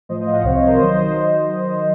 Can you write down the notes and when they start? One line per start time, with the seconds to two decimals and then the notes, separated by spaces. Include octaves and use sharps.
0.09 A2 F3 C5 D#5
0.20 C5 D#5
0.27 F5
0.32 D#5 F#5
0.43 C2 C3 F3 C#5 F5
0.55 C5 D#5
0.67 A#4 C#5
0.78 D#3 F#3 C5 D#5